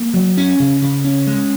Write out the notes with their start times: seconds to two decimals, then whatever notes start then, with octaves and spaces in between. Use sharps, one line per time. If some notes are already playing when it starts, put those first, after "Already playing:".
Already playing: A#3
0.14 F#3
0.37 C#4
0.59 C#3
0.82 C#3
1.04 C#4
1.27 G#3